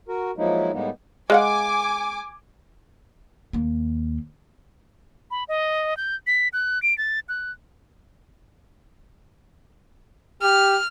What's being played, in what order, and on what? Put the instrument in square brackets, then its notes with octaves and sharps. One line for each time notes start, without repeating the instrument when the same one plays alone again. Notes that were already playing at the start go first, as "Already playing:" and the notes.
[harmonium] F#4 A#4
F3 F#3 G#3 A#3 D#4 E4
A2 G3 G#3 A#3 B3 D#4
[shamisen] G#3 F5 F#5 [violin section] G#5 D6
[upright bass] D#2 A#3
[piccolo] B5
D#5
G6
B6
F#6
D7
A6
F#6
[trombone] G4 [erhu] F6